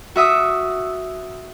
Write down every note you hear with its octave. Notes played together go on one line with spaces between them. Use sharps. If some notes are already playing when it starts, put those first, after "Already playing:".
F#4 E5 D#6 E6